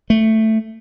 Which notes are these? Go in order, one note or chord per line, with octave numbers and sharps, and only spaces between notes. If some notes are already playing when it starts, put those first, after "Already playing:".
A3